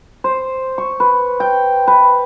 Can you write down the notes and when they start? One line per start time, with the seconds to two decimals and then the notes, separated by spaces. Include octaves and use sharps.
0.24 C5
0.78 C#6
1.00 B4
1.40 G5
1.87 B4